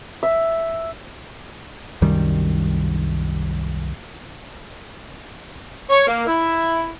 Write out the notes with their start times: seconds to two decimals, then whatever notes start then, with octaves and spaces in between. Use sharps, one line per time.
0.23 E5
2.02 C2 F#2 D#3 G3
5.90 C#5
6.07 A#3
6.27 E4